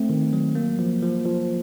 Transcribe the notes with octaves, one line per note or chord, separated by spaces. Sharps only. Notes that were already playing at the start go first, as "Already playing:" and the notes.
Already playing: A3 C4
D#3
F#3
A#3
F3
F3
F3